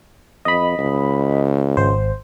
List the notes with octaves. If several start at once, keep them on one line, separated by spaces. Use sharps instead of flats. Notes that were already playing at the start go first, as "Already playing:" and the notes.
F2 D#5 B5
C#2
G#1 C5